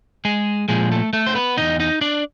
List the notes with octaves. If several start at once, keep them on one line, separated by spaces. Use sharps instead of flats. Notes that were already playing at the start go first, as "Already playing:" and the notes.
G#3 G#4
A#2 F3 G#3 G#4
A3 A4
A3 A4
C5
B3 B4
E2 B2 D#4 D#5
D#4 D#5
D4 D5